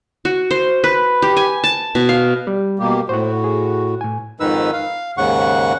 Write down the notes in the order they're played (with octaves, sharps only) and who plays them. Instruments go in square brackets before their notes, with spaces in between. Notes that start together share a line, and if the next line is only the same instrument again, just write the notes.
[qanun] F#4
C5
B4
G4
G#5
A5
B2
F5
[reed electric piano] G3
[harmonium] B2 A#3 G4
[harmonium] A2 F#4 [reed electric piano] C5 F#5
[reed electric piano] G#4
A2 G#5
[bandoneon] F2 G#2 D#3 D#4 B4 E6
F5
D#2 G#2 C#3 F#5 C#6